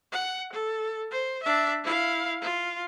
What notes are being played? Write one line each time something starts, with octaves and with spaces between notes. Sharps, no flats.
F#5
A4
C5
D4 E5
E4 F5
F4